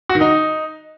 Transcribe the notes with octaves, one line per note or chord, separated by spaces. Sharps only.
F#4
D#3
D#4